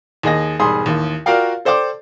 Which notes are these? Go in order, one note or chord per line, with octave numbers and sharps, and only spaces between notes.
D#2 G#4 D#5 A#6
E1 G#2 G3 G#4 C6 D#6
A1 D#2
F4 F#4 A#4 D5 F5 G5
A4 C5 D5 G5 D6